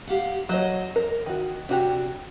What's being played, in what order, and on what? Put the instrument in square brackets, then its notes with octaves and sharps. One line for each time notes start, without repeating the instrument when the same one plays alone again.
[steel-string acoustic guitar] G4 F5 F#5
[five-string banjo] F#3 C#5 [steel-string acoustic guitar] C5 D#5
[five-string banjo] A#4
D#3 F#4
[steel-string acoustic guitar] C3 [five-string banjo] D4 F#4 G4